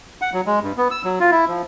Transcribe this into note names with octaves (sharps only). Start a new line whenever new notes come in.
F#5
F#3
G#3
G2
B3
E6
F#3
F4
E4
F3